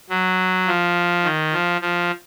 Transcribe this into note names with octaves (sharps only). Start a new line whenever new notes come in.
F#3
F3
D#3
F3
F3